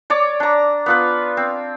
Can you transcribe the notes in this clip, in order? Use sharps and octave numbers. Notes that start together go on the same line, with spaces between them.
C#5 D5 D6
D4 A#5
B3 F4 B4
C4